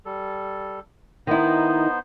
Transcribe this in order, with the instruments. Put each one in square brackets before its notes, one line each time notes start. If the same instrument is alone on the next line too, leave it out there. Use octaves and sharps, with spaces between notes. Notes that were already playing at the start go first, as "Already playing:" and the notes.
[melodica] G3 A4
[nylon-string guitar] D#3 E4 [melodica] B3 D#4 C5